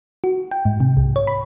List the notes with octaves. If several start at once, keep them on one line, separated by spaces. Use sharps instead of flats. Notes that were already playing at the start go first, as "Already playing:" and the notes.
F#4
G5
G#2
C3
C2
C#5
B5